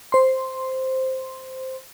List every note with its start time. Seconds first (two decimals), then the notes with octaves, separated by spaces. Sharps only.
0.12 C5 C6